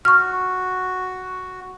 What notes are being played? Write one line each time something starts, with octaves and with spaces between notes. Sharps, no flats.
F#4 C#6 F6